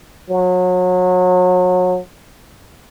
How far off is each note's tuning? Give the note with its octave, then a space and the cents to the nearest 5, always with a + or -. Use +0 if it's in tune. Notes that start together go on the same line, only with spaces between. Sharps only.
F#3 -30